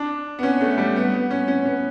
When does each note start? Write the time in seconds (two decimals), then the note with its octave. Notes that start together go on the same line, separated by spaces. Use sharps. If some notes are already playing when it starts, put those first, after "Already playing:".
Already playing: D4
0.39 B3
0.43 C#4
0.61 A3
0.78 G3
0.96 B3
1.14 B3
1.31 C#4
1.48 C#4
1.65 B3